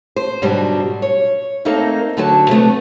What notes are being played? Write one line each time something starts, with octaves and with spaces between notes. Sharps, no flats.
C5
G#2 B2 D3 F#3 G3 D4
C#5
A3 A#3 C4 D#4 A4 A#4
D2 D3 F#3 F#4 G#5 A5
C3 F#3 A3 B3